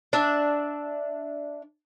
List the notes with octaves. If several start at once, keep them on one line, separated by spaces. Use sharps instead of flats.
D4 E5